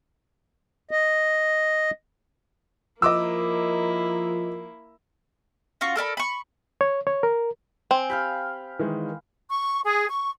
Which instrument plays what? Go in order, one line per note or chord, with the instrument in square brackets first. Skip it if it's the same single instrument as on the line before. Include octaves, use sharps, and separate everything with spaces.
[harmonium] D#5
[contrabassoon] F3 [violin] A#3 E4 [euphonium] A#4 [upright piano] D#5 D6 E6
[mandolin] C#4 F4 F#4 C#6
A4 A#4 D5 B5
B5 C#6
[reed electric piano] C#5
C#5
A#4
[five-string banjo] C4 [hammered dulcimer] G#5
[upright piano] G4 [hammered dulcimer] F5 G5 B5
[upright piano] D#3 E3 G#3
[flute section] C#6
G#4
C#6